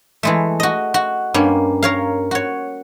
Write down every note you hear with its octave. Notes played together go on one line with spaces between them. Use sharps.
E3 G#3 A3
F#4 D#5
F#4
G2 A#3 C#4
A#4 C#5 F5
F#4 C#5